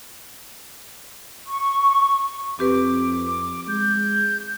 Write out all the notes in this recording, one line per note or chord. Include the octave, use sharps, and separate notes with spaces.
C#6
F2 C4 G4 B4 D6
D6
G#3 G6